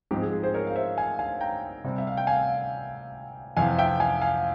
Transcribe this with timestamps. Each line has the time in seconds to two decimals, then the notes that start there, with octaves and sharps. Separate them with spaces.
0.11 G#2 F3 C4 G4
0.22 G#4
0.32 G#4
0.43 G#4 C5
0.54 A#4 C#5
0.67 F5
0.76 C5 E5
0.98 F5 G#5
1.19 F5 G#5
1.41 G5 A#5
1.84 C3 G3 C4
1.98 E5
2.07 F5
2.17 G5
2.27 F5 G#5
3.57 F2 C3 E3 F5 G#5
3.78 E5 G5
4.00 F5 G#5
4.22 F5 G#5